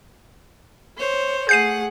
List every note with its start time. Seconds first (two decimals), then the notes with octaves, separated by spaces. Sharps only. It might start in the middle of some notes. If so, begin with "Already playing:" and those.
0.97 C5 C#5
1.49 A3 G#4 F#5 G6 C7 D#7